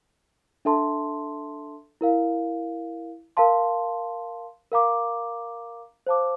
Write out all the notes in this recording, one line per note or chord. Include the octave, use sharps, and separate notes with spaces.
D4 A4 E5 A5 C6
E4 A#4 F5
A#4 F5 A5 C6
A#4 F5 A#5 D6
C5 F5 A5 D6